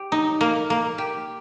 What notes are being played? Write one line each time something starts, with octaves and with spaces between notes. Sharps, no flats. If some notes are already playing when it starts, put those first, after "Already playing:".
Already playing: G4
D#4
A#3
A#3
G4